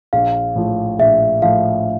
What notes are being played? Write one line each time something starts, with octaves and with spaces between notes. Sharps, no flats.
A#1 F5
A2 F3
A#1 E5
A2 F3 F5